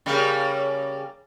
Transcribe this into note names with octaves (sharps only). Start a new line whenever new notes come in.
C#3 G3 A#3